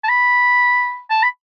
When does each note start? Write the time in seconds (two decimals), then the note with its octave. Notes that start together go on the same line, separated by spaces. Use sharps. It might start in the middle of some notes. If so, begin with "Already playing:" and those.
0.04 A5
0.09 B5
1.10 A5
1.23 B5